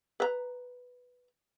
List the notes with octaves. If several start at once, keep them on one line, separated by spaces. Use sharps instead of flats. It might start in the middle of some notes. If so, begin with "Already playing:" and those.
B4 A#5